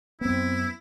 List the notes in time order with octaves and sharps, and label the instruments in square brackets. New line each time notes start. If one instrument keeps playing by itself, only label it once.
[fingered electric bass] F#2 B3 [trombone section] C4 [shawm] E4